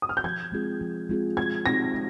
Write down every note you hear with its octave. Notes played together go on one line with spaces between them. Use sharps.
D#6
F6
G6
F3 G#6
G#3 C4 F4 G#4
F3
G#3 C4 F4 G#4
G#3 G#6
C4 D#4 A#6
G#3